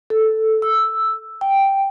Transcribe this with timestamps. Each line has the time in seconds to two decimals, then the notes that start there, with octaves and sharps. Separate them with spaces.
0.10 A4
0.62 E6
1.41 G5